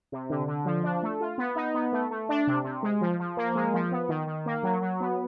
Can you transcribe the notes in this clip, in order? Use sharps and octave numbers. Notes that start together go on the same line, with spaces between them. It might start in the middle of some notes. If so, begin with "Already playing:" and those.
C3
D3
D3
F3
D4
A3
F4
B3
D#4
B3
A3
A3
D4
C3
C3
G#3
F3
F3
A#3
G#3
F3
B3
D#3
D#3
A#3
F#3
F#3
B3